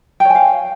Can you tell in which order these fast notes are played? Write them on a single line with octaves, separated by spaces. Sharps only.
G5 C#5 G#5 F5